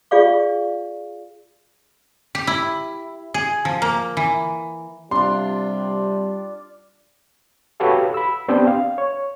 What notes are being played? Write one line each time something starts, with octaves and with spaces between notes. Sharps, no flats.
F4 G#4 D5 F5 C#6
G4
E4
G#4
F3
A#3
E3
C3 G3 D4 F4 C6
F#4 G4 A4 B4 C#5 F5
B5 E6
B3 C4 D4 G4 D5 G5
F5
C#5